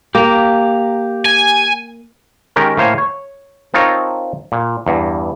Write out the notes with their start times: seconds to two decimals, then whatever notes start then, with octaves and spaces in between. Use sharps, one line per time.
0.15 A#3 G4 A#5
1.25 G#5
2.56 D#3 G#3 C#4 G4 A#4 A#5
2.77 A2 A#3 C5 C#5 F5 G#5
2.98 C#5
3.74 C4 D#4 F4 A4 A#4 C#5
4.52 A#2
4.86 E2 G2